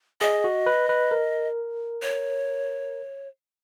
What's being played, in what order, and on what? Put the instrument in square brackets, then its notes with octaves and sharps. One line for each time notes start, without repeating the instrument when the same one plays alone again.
[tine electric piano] G#4 [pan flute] D#5
[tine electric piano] F#4
B4
B4
A#4
[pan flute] C#5